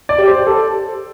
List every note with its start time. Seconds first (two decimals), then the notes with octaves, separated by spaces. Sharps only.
0.09 D5
0.19 G4
0.28 C5
0.47 A4